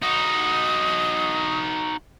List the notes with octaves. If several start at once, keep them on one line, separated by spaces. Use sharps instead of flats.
D#4 F#4 D#6